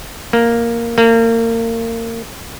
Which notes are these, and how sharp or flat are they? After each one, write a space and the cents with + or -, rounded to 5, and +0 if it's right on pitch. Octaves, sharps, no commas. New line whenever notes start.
A#3 +0
A#3 -30